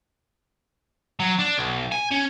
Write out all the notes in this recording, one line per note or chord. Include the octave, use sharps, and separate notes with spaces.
F#3
D4
B1
G#5
C#4